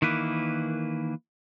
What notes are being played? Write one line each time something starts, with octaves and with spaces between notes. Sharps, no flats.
D#3 E3 A#3 B4